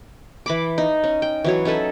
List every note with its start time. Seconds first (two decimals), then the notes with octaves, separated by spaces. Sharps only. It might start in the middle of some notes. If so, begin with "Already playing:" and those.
0.46 E3 B5 D6
0.78 D#4
1.04 C#4
1.22 G5
1.44 E3 F#3 C#5
1.65 C#4 D#4 A4 B4